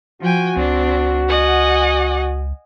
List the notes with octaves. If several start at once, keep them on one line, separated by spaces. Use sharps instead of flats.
F3 F#4 G5 G#5
C#2 C4 D4
D#5 F#5 G#5